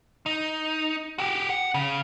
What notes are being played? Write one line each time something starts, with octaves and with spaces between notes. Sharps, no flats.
D#4
F#4 G4
F#5
C#3